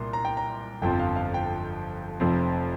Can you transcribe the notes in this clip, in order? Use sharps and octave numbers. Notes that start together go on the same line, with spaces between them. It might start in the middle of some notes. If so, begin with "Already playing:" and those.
Already playing: C2 A#2 A#3 C6
A#5
G5
A#5
G1 F2 F3 C4 G5
F5
F5
G5
F1 F2 F3 C4